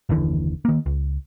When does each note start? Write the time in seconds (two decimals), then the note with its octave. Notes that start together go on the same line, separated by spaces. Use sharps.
0.09 F#1 D#2 D3 E3
0.65 D#3 A#3
0.86 C#2